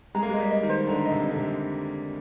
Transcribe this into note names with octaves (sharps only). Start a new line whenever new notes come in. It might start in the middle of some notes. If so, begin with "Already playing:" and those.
G#3 A#5
A#3
G#3
D#5
G3
D#5
D#3
C5
D3 A#5
D#5
C3
D#5
D3
C3